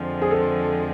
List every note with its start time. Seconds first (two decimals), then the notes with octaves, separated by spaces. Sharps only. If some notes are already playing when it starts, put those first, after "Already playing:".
Already playing: F2 D3 F3 G#3 C4
0.22 G#4
0.31 A4